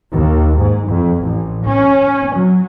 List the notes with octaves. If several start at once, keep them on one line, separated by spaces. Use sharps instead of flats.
D#2
G#2
F2
A1
C#4
F#3